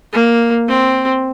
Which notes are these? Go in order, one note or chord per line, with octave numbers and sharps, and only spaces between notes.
A#3
C4